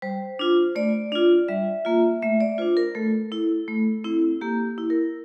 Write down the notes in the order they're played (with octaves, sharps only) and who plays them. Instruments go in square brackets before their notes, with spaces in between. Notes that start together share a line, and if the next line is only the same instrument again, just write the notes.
[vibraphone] G3 C5
D4 F4
A3 D5
D4 F4
G3 E5
A#3 F4
A3 E5
D5
D4 F4 C5
A#4
A3 A4
E4
A3
C4 E4
A#3 G4
E4
A#4